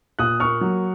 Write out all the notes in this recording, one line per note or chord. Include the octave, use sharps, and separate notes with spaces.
A#2 D#6 F#6
A#3 C#6 F6
F#3